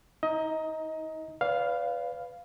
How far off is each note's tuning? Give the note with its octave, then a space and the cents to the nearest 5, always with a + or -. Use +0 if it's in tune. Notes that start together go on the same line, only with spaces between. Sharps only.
D#4 +45 D#5 +20 A#5 +0
B4 +15 D5 -35 F5 +0